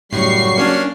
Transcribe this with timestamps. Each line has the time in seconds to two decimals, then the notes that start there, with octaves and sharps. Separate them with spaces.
0.13 F#2 A2 C#3 F#3 G3 C#6 C7
0.57 A#3 C#4 D4